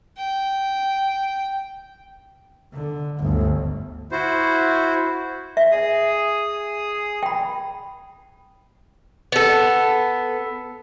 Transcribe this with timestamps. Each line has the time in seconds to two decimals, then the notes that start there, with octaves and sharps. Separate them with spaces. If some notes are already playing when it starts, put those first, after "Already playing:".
0.18 G5
2.74 D3
3.19 G1 D2
4.12 E4 F#4 C5
5.57 E5
5.71 G#4 D#6
7.23 G5 B5
9.32 B3 A4